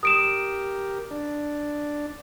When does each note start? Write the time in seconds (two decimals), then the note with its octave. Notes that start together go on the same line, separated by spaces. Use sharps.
0.03 G4 A#4 D#6 D7 E7
1.11 D4